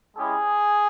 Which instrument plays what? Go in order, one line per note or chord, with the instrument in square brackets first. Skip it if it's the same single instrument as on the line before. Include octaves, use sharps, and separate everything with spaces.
[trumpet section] G#3 C#4 E4 G4 G#4